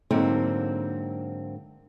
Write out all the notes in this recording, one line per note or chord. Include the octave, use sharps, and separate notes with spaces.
G#2 D3 F#3 A#3 C4